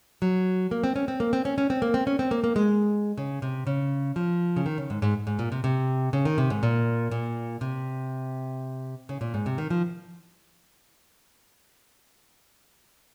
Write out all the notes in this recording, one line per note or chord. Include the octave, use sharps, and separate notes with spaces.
F#3
A#3
C4
C#4
C4
A#3
C4
C#4
C#4
C4
A#3
C4
C#4
C4
A#3
A#3
G#3
C#3
C3
C#3
F3
C#3
D#3
C#3
G#2
G#2
G#2
A#2
C3
C3
C#3
D#3
C3
G#2
A#2
A#2
C3
C#3
A#2
G#2
C3
D#3
F3